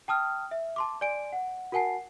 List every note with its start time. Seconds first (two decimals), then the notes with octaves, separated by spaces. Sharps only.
0.08 G5 A5 D#6 F6
0.51 E5
0.76 A5 C6 D6
1.01 D5 G#5 D7
1.32 F#5
1.72 F#4 A#4 F#5 G#5 A5 C7